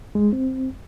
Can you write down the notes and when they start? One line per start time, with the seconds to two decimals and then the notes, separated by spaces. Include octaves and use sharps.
0.15 G#3
0.33 C4